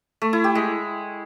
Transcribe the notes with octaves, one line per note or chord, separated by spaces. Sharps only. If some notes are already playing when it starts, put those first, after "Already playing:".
A3
E4
G4
G#3